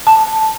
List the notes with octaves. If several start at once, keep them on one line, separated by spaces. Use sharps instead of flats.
A5